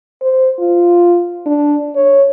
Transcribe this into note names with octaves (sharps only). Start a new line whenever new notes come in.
C5
F4
D4
C#5